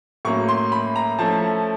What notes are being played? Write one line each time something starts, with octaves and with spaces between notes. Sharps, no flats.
A2 F#3 A#3 C#4 C#6
C6
B5
A#5
F3 A3 C#4 E4 A5